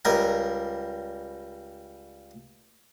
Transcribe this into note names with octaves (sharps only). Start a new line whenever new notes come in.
C#2 G3 A#4 G#5